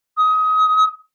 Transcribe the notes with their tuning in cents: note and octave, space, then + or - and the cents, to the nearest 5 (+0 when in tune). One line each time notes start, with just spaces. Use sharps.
D#6 +25